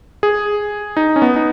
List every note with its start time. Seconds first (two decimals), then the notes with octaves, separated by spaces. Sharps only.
0.23 G#4
0.97 D#4
1.16 C#4
1.22 B3
1.36 D#4